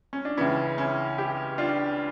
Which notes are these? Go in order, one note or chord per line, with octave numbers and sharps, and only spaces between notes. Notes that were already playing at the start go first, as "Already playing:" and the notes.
C#4
D4
C#2 C#3 E3 C#4 E4
C#4 E4
E4 G4
D4 F4